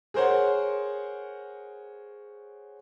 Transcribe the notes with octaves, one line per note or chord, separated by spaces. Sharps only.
G#4 A#4 C5 C#5 F#5